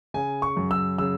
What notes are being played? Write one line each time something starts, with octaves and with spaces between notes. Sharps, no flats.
C#3 G#5
C#6
F#2
E6
C#3 E6